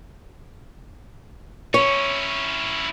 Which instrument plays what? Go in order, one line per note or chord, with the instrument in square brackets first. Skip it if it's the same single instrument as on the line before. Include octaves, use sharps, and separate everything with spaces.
[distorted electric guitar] C#4 E4 [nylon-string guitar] C#5